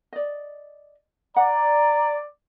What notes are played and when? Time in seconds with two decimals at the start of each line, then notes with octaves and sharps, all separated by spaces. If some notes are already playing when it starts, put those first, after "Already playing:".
0.13 D5 D#5
1.36 D5 F#5 A#5